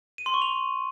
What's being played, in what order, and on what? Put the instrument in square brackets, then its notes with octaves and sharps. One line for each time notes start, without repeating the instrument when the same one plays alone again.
[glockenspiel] D#7
C6
C#6
F7